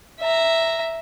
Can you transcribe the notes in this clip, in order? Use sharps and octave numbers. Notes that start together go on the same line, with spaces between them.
E5 A#5